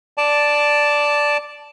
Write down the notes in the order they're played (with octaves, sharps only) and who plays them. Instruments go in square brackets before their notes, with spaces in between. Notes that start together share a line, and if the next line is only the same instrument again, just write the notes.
[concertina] D5 A5